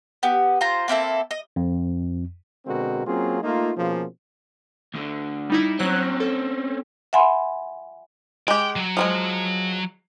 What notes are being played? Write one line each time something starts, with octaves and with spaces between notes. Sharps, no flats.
B3 G4
F4 C5 A#5
A#3 C4 E4 A4
D#5
F2
B2 D3 G#3 C4 F#4 A#4
F#3 A#3 C4 C#4 F4 G#4
A3 A#3 D#4 F4
B2 F3 A#3 C#4 F4 G#4
D2 D3
G3 D#4 E4
F#3 C4 C#4 F#6
A4
E5 F#5 G#5 B5 C6
G#3 G4 G5
F#3
F3 G3 G#3